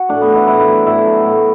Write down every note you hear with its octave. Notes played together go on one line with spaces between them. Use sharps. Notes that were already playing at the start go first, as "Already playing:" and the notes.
Already playing: F#4
A2 D4
B3
E3
E4
A2 E4
E4
F#3
A2 E4
F#3
A2